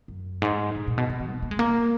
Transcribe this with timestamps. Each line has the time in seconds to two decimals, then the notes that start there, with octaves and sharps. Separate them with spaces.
0.08 F#2
0.42 G#2
0.76 A#2
0.88 A#2
0.98 B2
1.10 B2
1.20 D#3
1.31 B3
1.42 A#3
1.51 G#3
1.59 A#3